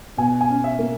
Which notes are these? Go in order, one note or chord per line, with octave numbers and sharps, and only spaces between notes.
B2 G#5
G#5
C#4
E5
A#3